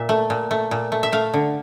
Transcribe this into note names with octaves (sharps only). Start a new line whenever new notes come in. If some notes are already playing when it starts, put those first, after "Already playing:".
Already playing: A#2 E5
A3
A#2
A3
A#2
A3
E5
A3 F5
D3